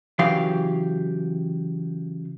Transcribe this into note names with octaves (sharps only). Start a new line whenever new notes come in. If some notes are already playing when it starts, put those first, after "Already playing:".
C#3 E3 F#3 G4 F5